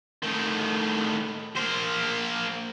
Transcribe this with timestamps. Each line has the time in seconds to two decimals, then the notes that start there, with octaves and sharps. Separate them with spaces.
0.23 A2 D#3
1.56 A#3 C5